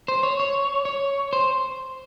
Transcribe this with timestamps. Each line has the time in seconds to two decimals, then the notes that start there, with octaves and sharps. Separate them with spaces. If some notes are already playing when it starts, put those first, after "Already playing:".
0.08 C5
0.23 C#5
0.40 C#5
0.85 C#5
1.33 C5